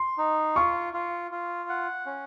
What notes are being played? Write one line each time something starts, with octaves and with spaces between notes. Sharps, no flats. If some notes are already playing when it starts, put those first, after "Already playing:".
Already playing: C6
D#4
F4 C#6
F4
F4
F#5
C#4